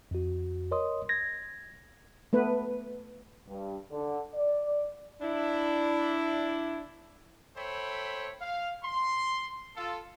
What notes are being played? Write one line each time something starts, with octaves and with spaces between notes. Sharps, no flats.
F2 F#4
A#4 C#5 D#5 C6 D#6
G#6 A#6
A3 B3 B4
G2
D3
D5
D4 E4
A4 C5 C#5 E5 G5 B5
F5
C6
F4 A4